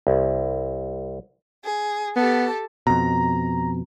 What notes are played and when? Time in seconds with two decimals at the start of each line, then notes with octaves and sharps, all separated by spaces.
0.07 C2
1.63 G#4
2.16 B3 G4 A4 A5
2.87 F2 B2 A#5